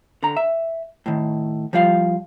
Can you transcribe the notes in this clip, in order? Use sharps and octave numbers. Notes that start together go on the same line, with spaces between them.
D3 A#5
E5
A2 D#3
F3 G3 F4 F5